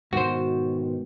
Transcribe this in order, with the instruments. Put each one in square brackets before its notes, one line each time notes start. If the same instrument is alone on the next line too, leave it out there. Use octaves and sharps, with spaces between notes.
[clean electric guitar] G#2 D#3 [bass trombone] B2 [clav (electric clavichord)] F#4 C5